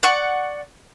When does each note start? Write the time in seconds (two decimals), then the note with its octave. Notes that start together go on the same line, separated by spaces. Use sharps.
0.03 D5 F#5 C#6